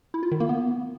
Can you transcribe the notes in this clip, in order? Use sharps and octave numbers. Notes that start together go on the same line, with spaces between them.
E4
F4
D#3
A#3
B3